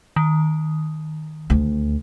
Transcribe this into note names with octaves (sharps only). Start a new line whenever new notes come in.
D#3
D2